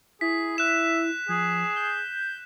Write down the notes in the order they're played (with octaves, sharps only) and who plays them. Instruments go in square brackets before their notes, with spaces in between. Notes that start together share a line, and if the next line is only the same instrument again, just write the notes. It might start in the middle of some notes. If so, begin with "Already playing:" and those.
[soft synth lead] E4 [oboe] G#4 [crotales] B6
[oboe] E5 [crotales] F#6 E7
[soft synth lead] F3 [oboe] G#4
[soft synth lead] G6